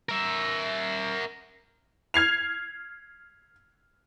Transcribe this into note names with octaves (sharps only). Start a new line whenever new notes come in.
A#4 E5
F6 G#6 C7 F7